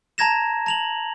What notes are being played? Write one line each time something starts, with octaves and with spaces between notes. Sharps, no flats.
A5 A#5 G#6 A#6 E7
A5 F7 F#7